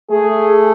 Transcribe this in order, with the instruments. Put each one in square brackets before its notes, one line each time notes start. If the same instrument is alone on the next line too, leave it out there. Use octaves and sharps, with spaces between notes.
[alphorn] A3 [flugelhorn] G#4